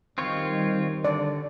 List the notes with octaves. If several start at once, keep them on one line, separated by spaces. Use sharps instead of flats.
D#3 G3 C4 F4 C#5
D3 D5